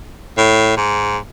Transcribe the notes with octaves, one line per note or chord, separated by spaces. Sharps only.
A2
G#2